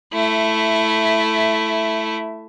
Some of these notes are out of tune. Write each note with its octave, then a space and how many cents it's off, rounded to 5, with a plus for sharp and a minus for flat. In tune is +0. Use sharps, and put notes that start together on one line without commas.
A3 +0 E4 +10